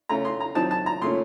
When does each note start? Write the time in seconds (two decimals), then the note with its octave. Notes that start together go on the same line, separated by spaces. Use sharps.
0.09 C#3 A3 C#4 A#5
0.25 C6
0.40 A#5
0.55 D#3 F#3 C4 D#4 A5
0.71 A5
0.86 A#5
1.02 A#2 A3 C#4 C6